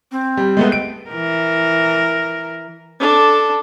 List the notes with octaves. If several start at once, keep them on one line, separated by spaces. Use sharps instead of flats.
C4
G3
G#3 A3 B3
D7
E3 A#4
D4 A4